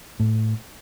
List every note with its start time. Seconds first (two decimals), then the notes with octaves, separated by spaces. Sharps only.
0.20 A2